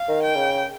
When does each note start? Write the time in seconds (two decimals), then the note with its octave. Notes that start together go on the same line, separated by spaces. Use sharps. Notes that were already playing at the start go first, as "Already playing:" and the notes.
Already playing: F5
0.09 D#3
0.22 G5
0.36 C#3